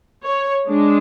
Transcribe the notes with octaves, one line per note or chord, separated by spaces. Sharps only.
C#5
G#3 D4